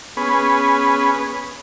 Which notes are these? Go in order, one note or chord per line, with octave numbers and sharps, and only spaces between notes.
B3 C#4 G#4 B4